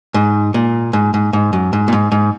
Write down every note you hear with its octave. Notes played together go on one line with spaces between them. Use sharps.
G#2
A#2
G#2
G#2
G#2
F#2
G#2
A#2
G#2
G#2